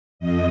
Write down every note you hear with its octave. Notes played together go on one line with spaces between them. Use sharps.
F2 D#5